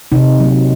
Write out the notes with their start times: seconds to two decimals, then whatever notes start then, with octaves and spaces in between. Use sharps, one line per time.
0.12 C3 D#4
0.40 F#3 A#3